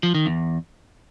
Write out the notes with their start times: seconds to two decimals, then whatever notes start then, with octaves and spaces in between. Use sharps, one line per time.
0.03 F3
0.15 D#3
0.26 E2